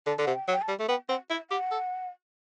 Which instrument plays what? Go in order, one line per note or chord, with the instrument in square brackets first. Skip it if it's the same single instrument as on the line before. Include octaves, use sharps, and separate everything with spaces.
[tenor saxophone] D3 [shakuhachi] A5
[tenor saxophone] D3
[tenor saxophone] C3 [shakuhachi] F#5
[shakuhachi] G5
[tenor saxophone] F#3
[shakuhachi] G5
A5
[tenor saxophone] G3
A3
[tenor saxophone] B3 [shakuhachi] G5
[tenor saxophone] C4 [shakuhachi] F#5
[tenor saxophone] E4 [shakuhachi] E5
[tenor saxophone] G4 [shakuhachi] F#5
[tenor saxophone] A4